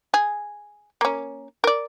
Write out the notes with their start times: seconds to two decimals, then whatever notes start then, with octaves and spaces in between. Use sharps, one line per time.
0.14 G#4
1.01 A#3 C#4
1.64 A#4 D5